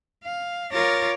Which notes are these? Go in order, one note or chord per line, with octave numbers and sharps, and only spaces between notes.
F5
F4 A#4 C#5 D6 A6 A#6